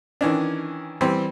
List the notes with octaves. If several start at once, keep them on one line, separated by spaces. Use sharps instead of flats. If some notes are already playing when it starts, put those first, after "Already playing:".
D#3 E3 C#4 D4
E3 G3 C4 C5